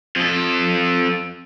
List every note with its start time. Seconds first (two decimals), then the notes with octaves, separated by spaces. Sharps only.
0.16 F2 A4